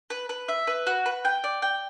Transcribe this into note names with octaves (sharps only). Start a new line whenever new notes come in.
B4
B4
E5
B4
F#4
B4
G5
D5
G5